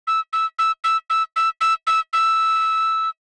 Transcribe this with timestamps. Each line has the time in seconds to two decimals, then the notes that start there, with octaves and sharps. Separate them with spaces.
0.07 E6
0.33 E6
0.59 E6
0.84 E6
1.10 E6
1.36 E6
1.61 E6
1.87 E6
2.13 E6